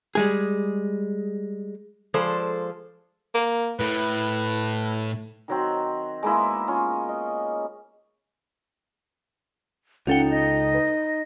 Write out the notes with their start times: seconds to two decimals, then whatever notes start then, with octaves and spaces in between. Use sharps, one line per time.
0.15 G3 G#3 G#4
2.14 F3 G#3 A4 C5 D5
3.35 A#3
3.80 A2 B4
5.48 D#3 F#3 C4
6.23 G#3 A#3 B3 E4
6.68 C#4 F4
7.09 D#5
10.07 C#2 C#4 D#4 F4 A4 F#5 G5
10.30 D#5
10.74 B4